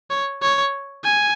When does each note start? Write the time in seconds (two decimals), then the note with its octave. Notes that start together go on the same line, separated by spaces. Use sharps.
0.10 C#5
0.42 C#5
1.04 G#5